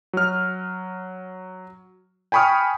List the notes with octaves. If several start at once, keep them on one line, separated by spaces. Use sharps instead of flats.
F#3 F6
G5 G#5 B5 C#6 D#6 F6